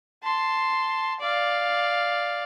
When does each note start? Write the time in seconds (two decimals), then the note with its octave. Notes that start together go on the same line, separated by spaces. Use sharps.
0.23 A5 C6
1.20 D5 F5